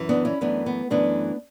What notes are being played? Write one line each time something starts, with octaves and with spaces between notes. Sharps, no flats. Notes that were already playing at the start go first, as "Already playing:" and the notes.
Already playing: F#2 E3
B3 D4
C#4 E4
F#2 E3 A3 B3 D4
B3
F#2 E3 A3 B3 D4